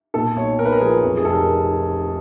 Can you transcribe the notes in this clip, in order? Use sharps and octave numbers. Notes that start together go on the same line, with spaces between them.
A#2 A4
B1 C#5
B1 A#4
B4
A#4
F3 G#4
F2
G#4
F1 A4
A#4